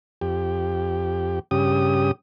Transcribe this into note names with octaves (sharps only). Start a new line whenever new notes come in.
F2 G4
G2 C#3 G4 D#6